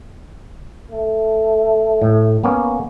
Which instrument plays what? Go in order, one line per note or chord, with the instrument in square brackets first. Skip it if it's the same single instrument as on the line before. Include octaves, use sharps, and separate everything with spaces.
[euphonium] A3
[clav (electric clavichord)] A2
A#3 B3 C#4